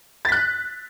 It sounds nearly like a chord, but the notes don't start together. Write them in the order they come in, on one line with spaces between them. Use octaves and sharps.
A6 B6 F#6